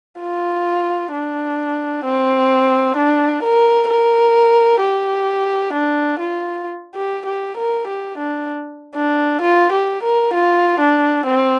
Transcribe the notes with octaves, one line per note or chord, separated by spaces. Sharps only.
F4
D4
C4
D4
A#4
A#4
G4
D4
F4
G4
G4
A#4
G4
D4
D4
F4
G4
A#4
F4
D4
C4